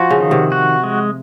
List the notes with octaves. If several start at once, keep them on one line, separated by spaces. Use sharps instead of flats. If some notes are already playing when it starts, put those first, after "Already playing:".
Already playing: F3 F#4
C#3
D#3
C3
F#4
G#3